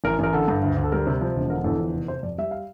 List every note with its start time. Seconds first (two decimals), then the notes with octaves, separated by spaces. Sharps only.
0.04 A1 A#4
0.19 A1 A#4
0.33 D3 A4
0.48 G2
0.63 D2
0.77 D2
0.84 A4
0.92 G3 A#4
1.07 C3
1.21 F3
1.36 E1
1.50 D3 A#4
1.64 E2 A4
1.79 F3
1.94 F1
2.08 C3 C5
2.23 F2 D5
2.38 G3 E5
2.51 F5